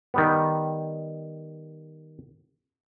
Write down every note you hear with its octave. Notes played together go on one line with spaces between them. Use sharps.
D#3 G3 B3